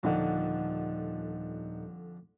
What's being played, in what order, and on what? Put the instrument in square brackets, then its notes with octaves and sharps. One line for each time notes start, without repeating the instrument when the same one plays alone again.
[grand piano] D#1 D#4 F#5 [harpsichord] F2 D3